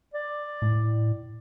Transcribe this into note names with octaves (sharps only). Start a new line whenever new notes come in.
D5
A2